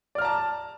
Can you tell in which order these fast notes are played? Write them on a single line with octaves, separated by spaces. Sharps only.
D5 F6 A#5 A5